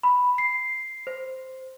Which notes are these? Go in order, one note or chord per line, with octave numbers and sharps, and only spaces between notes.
B5
C7
C5